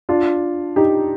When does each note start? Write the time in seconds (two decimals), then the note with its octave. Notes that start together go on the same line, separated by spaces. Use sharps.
0.09 D4 F4
0.76 D#4 G4